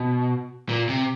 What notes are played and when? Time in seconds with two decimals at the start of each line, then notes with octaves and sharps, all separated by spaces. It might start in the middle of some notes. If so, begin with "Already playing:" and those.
Already playing: B2
0.69 A#2
0.89 C3